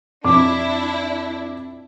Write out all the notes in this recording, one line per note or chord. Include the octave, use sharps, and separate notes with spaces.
F2 D4 E4 D6